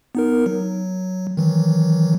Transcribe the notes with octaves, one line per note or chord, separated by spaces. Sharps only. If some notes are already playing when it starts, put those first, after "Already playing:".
B3 D#4 A#4
F#3
D#3 E3 F#3